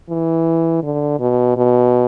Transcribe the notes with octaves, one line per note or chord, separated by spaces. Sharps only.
E3
D3
B2
B2